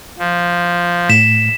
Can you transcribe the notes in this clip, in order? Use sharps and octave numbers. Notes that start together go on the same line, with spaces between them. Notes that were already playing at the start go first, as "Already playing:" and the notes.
F3
A2 B6 E7